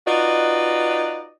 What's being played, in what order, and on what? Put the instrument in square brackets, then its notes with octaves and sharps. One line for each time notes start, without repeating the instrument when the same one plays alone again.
[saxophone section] D#4 F4 F#4 B4 D5 D#5